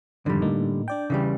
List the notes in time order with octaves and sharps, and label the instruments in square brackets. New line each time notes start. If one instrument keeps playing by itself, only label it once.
[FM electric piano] F2 G#2 D#3 [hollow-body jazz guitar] D3 G3
[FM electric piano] A2 A#3 D#4
D4 D5 G5
[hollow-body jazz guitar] C#3 E3 G3